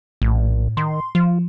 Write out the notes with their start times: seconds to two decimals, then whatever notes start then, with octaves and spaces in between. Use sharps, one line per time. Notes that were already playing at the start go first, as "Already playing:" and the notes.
0.22 A#1 A2
0.77 D#3 C6
1.15 F3 F4